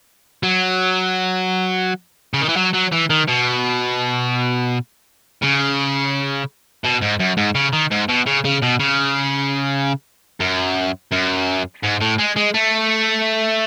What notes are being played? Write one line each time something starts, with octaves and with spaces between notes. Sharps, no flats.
F#3
C#3
D#3
E3
F#3
F#3
E3
D#3
B2
C#3
B2
G#2
F#2
G#2
C#3
D#3
G#2
B2
C#3
C#3
B2
C#3
F#2
F#2
G#2
A2
G#3
G#3
A3